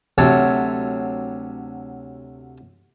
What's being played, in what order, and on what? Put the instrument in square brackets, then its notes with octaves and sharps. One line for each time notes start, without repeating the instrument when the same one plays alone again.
[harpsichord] D2 C3 F#3 A4 C#5